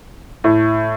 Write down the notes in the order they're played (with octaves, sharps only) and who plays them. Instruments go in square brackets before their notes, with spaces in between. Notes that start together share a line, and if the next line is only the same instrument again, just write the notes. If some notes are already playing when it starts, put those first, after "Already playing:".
[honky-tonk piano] A2